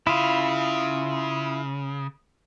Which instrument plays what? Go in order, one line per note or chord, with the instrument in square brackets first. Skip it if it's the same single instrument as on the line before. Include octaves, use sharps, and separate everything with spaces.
[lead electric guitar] C#3 [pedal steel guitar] E4 F4